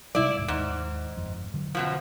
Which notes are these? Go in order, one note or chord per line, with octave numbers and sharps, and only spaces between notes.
C3 G3 G#3 E4 D5
E1 D#2 G#2
D#2 G#2
G1 F2
D3 F#3
F#2 B2 F3